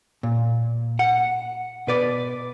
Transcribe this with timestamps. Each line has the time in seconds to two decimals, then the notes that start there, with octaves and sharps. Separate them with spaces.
0.23 A#2
0.99 F#5
1.87 B2 B4 D5